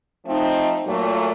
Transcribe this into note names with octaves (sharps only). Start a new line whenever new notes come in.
F3 A3 C4 D#4
A#2 F#3 A3